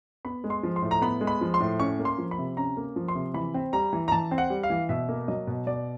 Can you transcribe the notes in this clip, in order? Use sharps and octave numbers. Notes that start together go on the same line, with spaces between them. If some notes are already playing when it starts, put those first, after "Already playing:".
B3 B5
G#3
C6
F3
C6
A2
A#5
B3 B5
G#3
B5
F3
C6
A2
C#4 C#6
A#3
C6
F3
B5
C3
C#4 A#5
A#3
F3
C6
C3
E3 B5
C4
G3 A#5
E3
A#5
E3 A5
C4
F#5
G3
F5
E3
B2 E5
A#3
F#3 D#5
B2
B2 D5